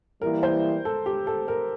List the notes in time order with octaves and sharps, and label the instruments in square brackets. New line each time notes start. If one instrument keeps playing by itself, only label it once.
[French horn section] E3 G3 A#3 E4 [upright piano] A#4
[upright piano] C5
A4
G4
A4
A#4